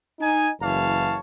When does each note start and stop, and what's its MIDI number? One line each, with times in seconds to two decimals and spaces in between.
0.20 0.50 63
0.20 0.50 80
0.61 1.19 30
0.61 1.19 42
0.61 1.19 52
0.61 1.19 73
0.61 1.19 77
0.61 1.19 81